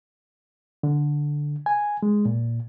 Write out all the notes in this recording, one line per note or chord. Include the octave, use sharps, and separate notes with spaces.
D3
G#5
G#3
A#2